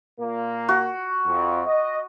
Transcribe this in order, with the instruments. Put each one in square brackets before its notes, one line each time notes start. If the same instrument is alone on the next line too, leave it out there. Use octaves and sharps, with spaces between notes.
[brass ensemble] A#2 A#3
[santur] F#4
[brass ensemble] F2
D#5